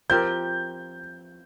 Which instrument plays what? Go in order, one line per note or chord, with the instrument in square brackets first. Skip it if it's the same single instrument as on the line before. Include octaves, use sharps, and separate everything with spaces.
[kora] F3 C4 G4 A#4 [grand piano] G6